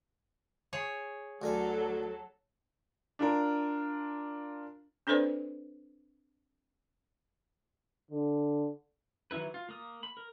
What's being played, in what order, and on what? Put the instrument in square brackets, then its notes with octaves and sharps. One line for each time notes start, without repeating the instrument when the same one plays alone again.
[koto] G#4 C#5
[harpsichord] D2 D3 G#5 [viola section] F#3 A4
[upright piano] D4 F4 A#4
[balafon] C4 D4 A4 B4 C5 D5
[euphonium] D3
[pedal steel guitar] D#3 E3 F#3 E4 B4
F4
A#3 D#6
B5
A#4